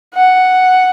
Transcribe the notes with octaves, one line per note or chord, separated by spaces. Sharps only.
F#5